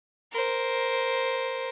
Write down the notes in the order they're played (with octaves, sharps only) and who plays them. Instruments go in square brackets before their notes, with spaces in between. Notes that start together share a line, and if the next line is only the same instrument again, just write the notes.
[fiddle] A#4 C5